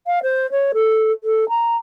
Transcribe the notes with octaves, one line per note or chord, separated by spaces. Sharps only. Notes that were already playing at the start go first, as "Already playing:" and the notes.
F5
C5
C#5
A4
A4
A#5